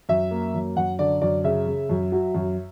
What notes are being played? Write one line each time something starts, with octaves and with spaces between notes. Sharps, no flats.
F#2 E5
A#3
F#2
F#2 F#5
D3 D5
F#2 D5
C#3 E5
C#3
F#2
F#3
F#2